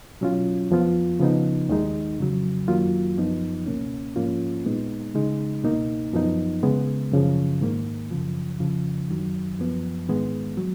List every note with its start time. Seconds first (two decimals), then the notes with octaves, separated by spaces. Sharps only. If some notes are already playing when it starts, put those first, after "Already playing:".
0.21 B2 F#3 C#4 F4
0.71 F2 F3 B3 F4
1.20 C#3 F3 B3 D#4
1.69 D#2 D#3 G#3 D#4
2.19 F2 C#3 F#3
2.68 F#2 D#3 F#3 A#3 F4
3.17 F#2 F3 B3 D#4
3.66 C#2 B2 A#3 C#4
4.16 G#2 F3 A#3 C#4 F4
4.66 A#2 G#3 B3 D#4
5.15 C#3 G#3 D#4
5.64 C#2 B2 A#3 D#4
6.13 F#2 F3 B3 D#4
6.63 C#3 G#3 B3
7.12 F#2 C#3 F3
7.61 G#2 D#3 A#3
8.11 F#2 C#3 F3
8.60 F2 C#3 F3
9.09 F#2 D#3 F#3
9.59 F#2 F3 B3
10.08 G#2 D#3 G#3 B3
10.58 F#3